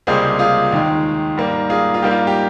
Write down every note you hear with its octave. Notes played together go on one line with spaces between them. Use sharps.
C#2 C3 G3 A#3 G#4 C5
F4 G#4
D#2 D#3 G#3
G#2 G3 A#3
F4 G#4
F4
G#2 G3 A#3 G4
F4
G4